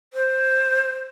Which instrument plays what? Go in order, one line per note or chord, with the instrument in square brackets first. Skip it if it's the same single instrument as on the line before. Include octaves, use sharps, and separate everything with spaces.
[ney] C5